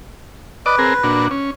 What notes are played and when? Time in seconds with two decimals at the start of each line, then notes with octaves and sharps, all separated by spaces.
0.66 B4 D5 D#5 D6
0.79 C4 G#4 A#4
1.04 A#2 D4 F#4
1.31 C#4